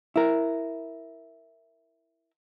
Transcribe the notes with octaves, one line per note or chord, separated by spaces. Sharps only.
E4 A#4